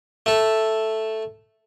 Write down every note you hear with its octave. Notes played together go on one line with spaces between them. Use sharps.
A3 A4